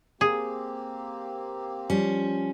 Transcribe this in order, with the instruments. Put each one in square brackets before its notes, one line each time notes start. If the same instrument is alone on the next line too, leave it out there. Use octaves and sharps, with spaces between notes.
[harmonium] A#3 C4 G4 [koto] G#4
[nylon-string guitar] F3 G3 [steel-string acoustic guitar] C#4